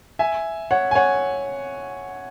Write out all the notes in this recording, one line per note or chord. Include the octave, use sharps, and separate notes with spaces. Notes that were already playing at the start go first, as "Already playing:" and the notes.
E5 G#5
C#5 F#5
G#5
C#5 F#5